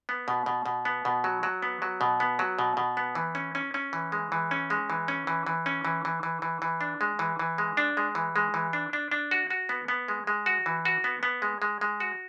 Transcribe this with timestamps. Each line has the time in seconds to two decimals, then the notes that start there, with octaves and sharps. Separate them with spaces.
0.09 B3
0.28 B2
0.46 B2
0.66 B2
0.85 B3
1.05 B2
1.24 F#3
1.43 F#3
1.62 B3
1.82 F#3
2.01 B2
2.20 B3
2.39 F#3
2.59 B2
2.77 B2
2.97 B3
3.15 E3
3.35 C#4
3.55 C#4
3.74 C#4
3.93 E3
4.12 G#3
4.32 E3
4.51 C#4
4.70 G#3
4.90 E3
5.08 C#4
5.27 E3
5.47 E3
5.66 C#4
5.85 E3
6.05 E3
6.23 E3
6.42 E3
6.62 E3
6.81 D4
7.01 G#3
7.19 E3
7.39 E3
7.58 G#3
7.77 D4
7.97 G#3
8.15 E3
8.36 G#3
8.54 E3
8.73 D4
8.93 D4
9.12 D4
9.31 F#4
9.50 F#4
9.69 B3
9.88 B3
10.08 G#3
10.27 G#3
10.46 F#4
10.66 E3
10.85 F#4
11.04 B3
11.23 B3
11.42 G#3
11.62 G#3
11.81 G#3
12.00 F#4